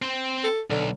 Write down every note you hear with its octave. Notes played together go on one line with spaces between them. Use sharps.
C4 C5
A4
B1 D3